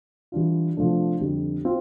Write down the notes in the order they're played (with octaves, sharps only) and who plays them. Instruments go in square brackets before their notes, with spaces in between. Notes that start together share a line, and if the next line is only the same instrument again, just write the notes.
[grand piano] E3 G3 D4 F4
C3 F3 A3 D4
F2 D3 G3
C4 F4